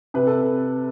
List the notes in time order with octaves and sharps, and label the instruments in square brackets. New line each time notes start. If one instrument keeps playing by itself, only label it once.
[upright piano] C3 B4
A4